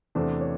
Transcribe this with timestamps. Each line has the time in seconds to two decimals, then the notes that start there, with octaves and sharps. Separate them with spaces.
0.15 E2 C3 E3 A3 D4 C5
0.41 C#5